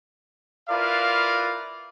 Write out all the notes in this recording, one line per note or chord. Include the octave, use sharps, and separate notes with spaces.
E4 F4 A#4 B4 D5 F5